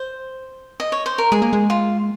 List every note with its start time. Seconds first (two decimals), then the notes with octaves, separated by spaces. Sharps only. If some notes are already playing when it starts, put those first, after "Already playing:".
Already playing: C5
0.80 D#5
0.92 C#5
1.06 C5
1.18 A#4
1.32 G#3 G#4
1.42 A#3
1.53 G#3
1.70 F4